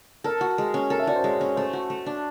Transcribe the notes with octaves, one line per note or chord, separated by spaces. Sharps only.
A4 A#4
F#4
G#3
C#4
A4 A#4
E5
F#4 D5
C5
G#3 C#5
C#4
A3 C5
F#4
A3
D4